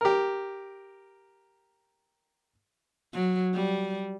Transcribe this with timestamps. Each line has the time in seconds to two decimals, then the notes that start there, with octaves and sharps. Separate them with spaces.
0.01 G4 A#4
3.13 F#3
3.54 G3